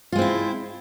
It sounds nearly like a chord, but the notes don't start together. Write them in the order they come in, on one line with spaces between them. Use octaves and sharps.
F4 G#3 C4 E4